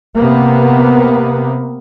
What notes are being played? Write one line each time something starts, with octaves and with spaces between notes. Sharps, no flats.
C3 A#3 B3